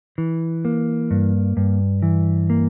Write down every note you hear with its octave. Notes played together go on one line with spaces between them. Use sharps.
E3
A#3
G2
G2
E3
A#3